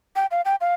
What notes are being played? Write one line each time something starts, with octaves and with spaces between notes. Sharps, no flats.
G5
F5
G5
F5